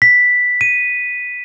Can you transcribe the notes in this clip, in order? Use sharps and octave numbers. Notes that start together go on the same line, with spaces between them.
B6
D#7